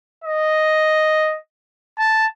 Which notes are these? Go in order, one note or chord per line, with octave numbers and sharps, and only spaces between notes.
D#5
A5